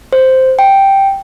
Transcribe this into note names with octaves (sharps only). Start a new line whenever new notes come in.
C5
G5